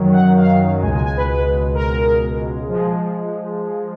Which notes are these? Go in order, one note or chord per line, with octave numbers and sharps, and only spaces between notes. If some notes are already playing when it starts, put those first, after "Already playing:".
Already playing: F#2 D#3 F#3
F#5
F5
C#2 B2 G#3 G#5
G#5
G#5
B4
B4
A#4
F3 G#3